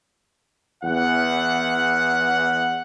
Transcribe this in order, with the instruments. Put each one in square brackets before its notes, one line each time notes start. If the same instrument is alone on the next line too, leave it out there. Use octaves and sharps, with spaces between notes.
[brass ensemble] E2 F#5